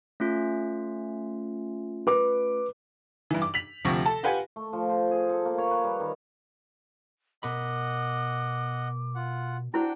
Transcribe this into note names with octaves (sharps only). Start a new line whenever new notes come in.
A3 C#4 F4
B4 D6
G2 E3
D6
B6 F7 F#7
D2 C3 F3 C#6 A#6
A4 A5
F4 G4 B4 F#5 G#5
A3
F3
C5
G#4
A4
A#3
C#5
B4
G3
D#3
B2 A#4 D#5 F#5 B5 D6
F4 F#5
D4 E4 F#4 C5 F#5 G5